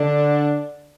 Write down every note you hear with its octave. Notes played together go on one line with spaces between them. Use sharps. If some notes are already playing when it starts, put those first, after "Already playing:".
Already playing: D3 D4